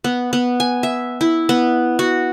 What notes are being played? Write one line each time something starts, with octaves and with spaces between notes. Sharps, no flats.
B3
B3
G#5
E5
E4
B3
F#4